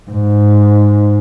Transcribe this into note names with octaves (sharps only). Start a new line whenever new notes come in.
G#2